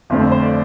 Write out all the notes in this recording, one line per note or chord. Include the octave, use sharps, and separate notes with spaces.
G1 F2 D3 A3 C4
C5
C5
D5